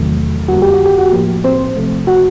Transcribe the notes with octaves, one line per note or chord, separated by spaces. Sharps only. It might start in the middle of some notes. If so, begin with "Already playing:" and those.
Already playing: E2 C3 D#3 F#3 A3
F2 D3 G3 A#3 F#4
G4
F#4
G4
F#4
A2 F3 A#3 G4
C4 C5
C3 F3 A3
F#4 F#5